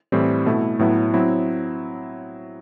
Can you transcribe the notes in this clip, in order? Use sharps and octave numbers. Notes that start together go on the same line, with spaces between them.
A2 E3 G3 C4
B2 A3 E4
A2 F#3 B3 E4
F#3 C4 E4